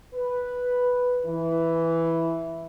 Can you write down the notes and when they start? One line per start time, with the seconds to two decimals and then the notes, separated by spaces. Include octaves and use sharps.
0.15 B4
1.26 E3